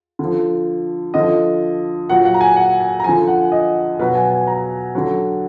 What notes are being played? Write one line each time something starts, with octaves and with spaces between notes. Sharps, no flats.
D3 F3
D3 F3 D#5
A#2 F#3 F#5
F#5
A#5
G#5
F#5
G#5
A#5
D3 F3 G#5
F#5
D#5
B2 F#3 B4
G#5
G#5
A#5
D3 F#3